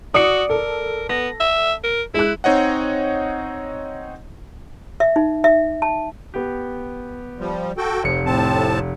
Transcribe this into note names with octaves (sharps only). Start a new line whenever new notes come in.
F#4 D5 D#6 C#7
A4 A#4
B3 A#6
E5
A#4
G#3 E4 F#6
C4 D#4 C#5 D#5 F#5
E5
D#4
E5
A5
B3 G4
F3 G3
F#4 A4 G5
F1 F3 C#7
A2 C4 A5